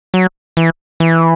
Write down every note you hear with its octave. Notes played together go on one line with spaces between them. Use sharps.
F#3
E3
E3